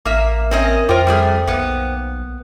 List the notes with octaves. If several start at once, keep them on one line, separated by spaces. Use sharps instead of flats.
A1 A#3 E5 D6
C4 C#4 A#4 D#5 E5
F2 F4 A#4 C5 G5 D6
G3 A3 G#4
B1 A#3 B3